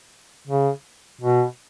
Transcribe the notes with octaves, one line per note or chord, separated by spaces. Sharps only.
C#3
B2